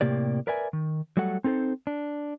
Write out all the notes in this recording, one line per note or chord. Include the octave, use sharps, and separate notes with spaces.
A2 C3 A#3 G4 D5
A#4 B4 D5 E5 G#5
D#3
F#3 G3 A3 A4 F#5
C4 D#4 A4 B4 C5
D4